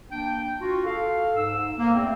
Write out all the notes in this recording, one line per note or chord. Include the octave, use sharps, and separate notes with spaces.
A#3 D4 G5
F4 F#4
A4 F5
G#2 E6
A#3
E2 A3 C4